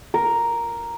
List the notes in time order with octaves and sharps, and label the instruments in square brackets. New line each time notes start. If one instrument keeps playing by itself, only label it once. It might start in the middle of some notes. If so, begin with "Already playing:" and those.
[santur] A#4